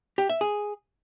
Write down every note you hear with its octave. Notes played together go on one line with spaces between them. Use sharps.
G4
E5
G#4